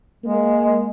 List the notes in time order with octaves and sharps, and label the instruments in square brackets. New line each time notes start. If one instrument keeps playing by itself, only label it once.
[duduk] G#3 [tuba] A#3